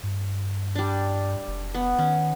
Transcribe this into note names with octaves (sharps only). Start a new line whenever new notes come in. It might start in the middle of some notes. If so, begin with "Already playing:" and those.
G2
G3 D4
F1
B3
D#3 C#4